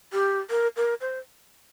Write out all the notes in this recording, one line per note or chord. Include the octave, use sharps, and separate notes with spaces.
G4
A#4
A#4
C5